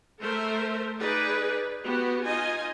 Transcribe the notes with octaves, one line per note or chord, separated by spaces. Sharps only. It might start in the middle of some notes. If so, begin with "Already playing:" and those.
A3 A4 A#4 C5 E5
D#4 G#4 B4 D5
B3 F#4 G4
D#4 F4 D#5 G#5